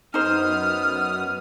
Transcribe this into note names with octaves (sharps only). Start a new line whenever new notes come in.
F#2 B3 D#4 C5 D#6 F6